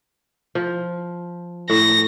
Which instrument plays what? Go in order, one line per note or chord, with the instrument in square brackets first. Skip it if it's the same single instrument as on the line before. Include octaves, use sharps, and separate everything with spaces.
[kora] F3
[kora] A2 [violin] A#6